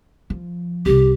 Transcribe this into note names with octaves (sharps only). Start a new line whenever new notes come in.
F3
C2 C3 G4